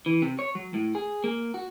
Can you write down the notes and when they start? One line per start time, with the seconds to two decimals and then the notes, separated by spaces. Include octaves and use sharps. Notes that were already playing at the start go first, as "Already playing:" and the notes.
0.06 E3
0.22 C3
0.39 C#5
0.55 F#3
0.74 A2
0.95 G#4
1.24 A#3
1.54 F#4